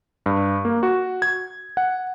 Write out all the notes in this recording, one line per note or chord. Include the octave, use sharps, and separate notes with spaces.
G2
A#3
F#4
G#6
F#5